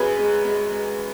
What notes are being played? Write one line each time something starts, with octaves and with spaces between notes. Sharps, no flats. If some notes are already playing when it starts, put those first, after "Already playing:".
Already playing: F#2 G#4 B4
G#3
G#3
G#3